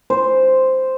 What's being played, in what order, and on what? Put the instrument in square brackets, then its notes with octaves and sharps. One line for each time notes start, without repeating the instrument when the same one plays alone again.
[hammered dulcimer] C5